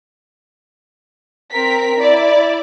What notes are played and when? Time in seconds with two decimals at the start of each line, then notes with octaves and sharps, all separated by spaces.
1.53 C4 A#4 B6
2.00 E4 D5